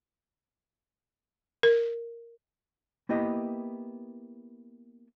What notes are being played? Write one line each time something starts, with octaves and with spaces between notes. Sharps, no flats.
A#4
A#3 B3 E4 G4 D#5